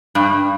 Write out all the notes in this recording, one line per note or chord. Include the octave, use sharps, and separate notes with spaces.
G2